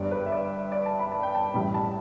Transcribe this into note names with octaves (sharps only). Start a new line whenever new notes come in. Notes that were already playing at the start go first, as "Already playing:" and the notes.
Already playing: G1 G2 G3 D5
B4
E5
D5
D5
A5
B5
A5
G5
A5
A1 A2 G3 B5
A5